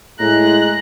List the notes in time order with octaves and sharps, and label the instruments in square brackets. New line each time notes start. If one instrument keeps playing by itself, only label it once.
[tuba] A2 [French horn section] G#3 [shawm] A#5 [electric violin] F#6